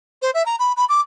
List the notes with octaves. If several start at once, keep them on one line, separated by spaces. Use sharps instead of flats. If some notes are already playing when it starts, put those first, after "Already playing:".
C5
E5
A#5
B5
B5
D6